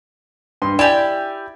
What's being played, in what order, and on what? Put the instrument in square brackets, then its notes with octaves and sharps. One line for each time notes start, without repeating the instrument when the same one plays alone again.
[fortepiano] G2 C6
[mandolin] E4 G4 [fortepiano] D5 G#5